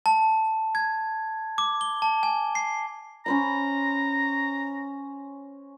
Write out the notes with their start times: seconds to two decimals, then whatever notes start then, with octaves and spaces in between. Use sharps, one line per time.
0.06 A5
0.75 G#6
1.58 D6
1.81 G7
2.02 A5
2.23 G#5
2.55 C7
3.26 C#4 C5 A#5 B5